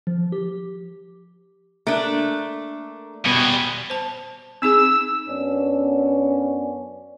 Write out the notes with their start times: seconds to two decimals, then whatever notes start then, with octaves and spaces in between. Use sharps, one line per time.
0.07 F3
0.32 G4
1.87 A3 A#3 D4
3.26 B2 G3 B3 G#5
3.90 C5 A5
4.62 C4 D#4 G#4 E6
5.27 F#2 B3 C#4 D4